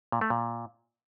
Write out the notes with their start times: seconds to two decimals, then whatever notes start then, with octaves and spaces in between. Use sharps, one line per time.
0.12 A#2
0.21 A3
0.30 A#2